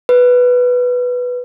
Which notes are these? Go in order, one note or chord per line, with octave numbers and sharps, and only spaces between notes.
B4